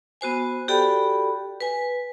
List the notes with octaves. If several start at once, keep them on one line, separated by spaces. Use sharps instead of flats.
B3 F#4 C5 G#5
F#4 G4 A4 D5 G5 B5
B4 G#5